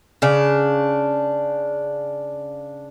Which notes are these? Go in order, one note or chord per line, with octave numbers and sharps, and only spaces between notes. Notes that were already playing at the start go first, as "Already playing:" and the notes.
C#3 D4